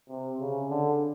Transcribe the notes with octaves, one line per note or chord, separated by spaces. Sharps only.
C3
C#3
D3